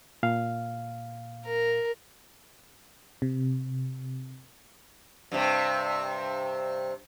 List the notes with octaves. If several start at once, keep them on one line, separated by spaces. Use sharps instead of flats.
A#2 F5
A#4
C3
G2 C3